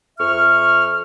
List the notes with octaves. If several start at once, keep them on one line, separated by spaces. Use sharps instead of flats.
F2 E5 C#6 F6